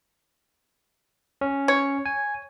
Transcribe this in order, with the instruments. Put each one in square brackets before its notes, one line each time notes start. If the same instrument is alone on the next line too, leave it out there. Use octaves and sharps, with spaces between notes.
[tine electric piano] C#4
[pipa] C#5
[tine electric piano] G#5